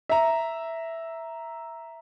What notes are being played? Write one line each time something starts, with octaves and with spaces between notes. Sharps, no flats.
E5 A#5